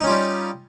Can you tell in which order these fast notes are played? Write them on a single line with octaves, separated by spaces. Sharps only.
D#4 C#4 F4 G3